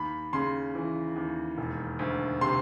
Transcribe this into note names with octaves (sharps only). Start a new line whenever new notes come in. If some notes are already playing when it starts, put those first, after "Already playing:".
Already playing: D#2 B5
C#3 C6
E3
D#2
E1
D2
C3 C6